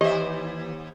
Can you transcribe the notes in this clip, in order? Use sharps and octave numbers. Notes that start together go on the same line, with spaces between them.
D#2 E3 G4 C5 D#5 E5